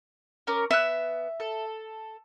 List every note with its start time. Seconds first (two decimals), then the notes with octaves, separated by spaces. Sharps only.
0.47 C#4 A#4 D6
0.71 B3 E5 F#6
1.40 A4